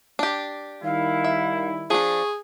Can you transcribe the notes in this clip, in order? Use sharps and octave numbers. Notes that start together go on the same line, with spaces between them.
D4 G4
D#3 G3 E4 F5
E5
F3 D4 G#4 C#6